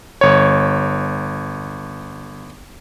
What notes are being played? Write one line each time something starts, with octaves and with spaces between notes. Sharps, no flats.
G1 C#5